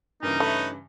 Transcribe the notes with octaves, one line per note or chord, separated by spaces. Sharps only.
G2 C#3 E3 A#3 D#4
A3 E4 B4 C#5